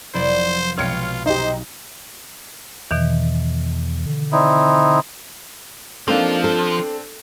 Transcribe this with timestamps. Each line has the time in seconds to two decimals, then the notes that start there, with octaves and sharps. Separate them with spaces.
0.14 F1 F#3 E4 C5 D5 C6
0.78 B1 G#3 F4 C#5 G5 F6 C#7
1.26 D#4 G4 C5
2.91 E2 B2 D#3 E3
4.06 D3
4.32 C4 D#4 E4 D5
6.08 F3 A#3 C4 D4 D#4 A4
6.44 A4